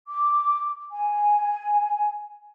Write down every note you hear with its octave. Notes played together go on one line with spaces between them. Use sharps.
D6
G#5